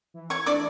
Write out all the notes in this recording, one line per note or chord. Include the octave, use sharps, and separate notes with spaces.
E3
C#5 C#6
A3 D4 D5 D6